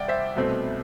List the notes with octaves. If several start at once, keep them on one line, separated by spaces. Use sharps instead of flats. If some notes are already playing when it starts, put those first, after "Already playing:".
Already playing: C2 D5 F#5 G5
C5 E5
C2 B2 A3 C4